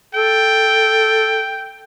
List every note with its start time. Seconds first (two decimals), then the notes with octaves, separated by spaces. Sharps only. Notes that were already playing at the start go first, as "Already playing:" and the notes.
0.15 A4 G5